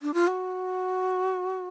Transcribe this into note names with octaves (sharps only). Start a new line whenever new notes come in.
D4
F4
F#4